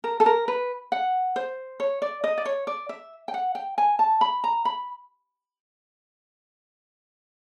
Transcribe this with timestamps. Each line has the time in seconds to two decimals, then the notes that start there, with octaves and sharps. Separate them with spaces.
0.04 A#4
0.20 A4
0.26 A#4
0.48 B4
0.92 F#5
1.36 C5
1.80 C#5
2.02 D5
2.24 D#5
2.38 D5
2.45 C#5
2.67 D5
2.89 E5
3.28 G5
3.34 F#5
3.55 G5
3.78 G#5
3.99 A5
4.21 B5
4.44 A#5
4.65 B5